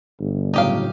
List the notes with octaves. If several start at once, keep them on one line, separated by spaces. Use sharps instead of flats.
G1
A2 C#3 F#3 D#4 G4 F5